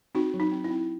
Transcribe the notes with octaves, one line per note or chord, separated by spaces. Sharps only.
C4 D#4 F#4
F#3
D#4
C4
E4
C4